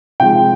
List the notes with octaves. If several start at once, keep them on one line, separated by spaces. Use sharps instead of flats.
C3 F3 G#3 G5